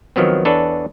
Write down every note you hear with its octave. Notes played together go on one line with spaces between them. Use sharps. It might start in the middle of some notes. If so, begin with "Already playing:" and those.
D#3 F3 F#3 B3 C4
E2 D4 A4 B4 C#5